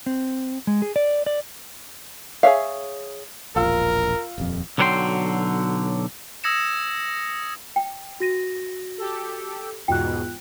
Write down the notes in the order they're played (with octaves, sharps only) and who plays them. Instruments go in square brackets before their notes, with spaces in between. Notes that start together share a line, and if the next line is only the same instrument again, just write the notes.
[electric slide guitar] C4
G#3
G#4
D5
D5
[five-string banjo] G#4 A4 C#5 E5 F5
[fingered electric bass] E1 A#1 [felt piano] F4 F5 E6 [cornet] A#4
[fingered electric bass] D#1 F2
[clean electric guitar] B1 D3 F#3 C5 G5 C6
[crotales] D#6 E6 G#6 A#6 C#7 E7
[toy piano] G5
[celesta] F#4 A#6 D#7
[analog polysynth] G4 A4
[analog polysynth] E2 G#2 B2 [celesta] F4 F#6 [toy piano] G5